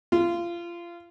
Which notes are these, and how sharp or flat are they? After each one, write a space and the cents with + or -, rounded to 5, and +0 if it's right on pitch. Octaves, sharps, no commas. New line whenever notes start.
F4 -25